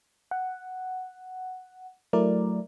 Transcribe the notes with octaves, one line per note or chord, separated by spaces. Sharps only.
F#5
F#3 A3 E4 A#4 D5